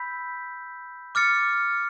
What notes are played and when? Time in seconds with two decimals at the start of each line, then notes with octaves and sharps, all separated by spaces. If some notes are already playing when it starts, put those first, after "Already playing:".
Already playing: B5 E6 G6 B6
1.15 D6 F6 A6 C#7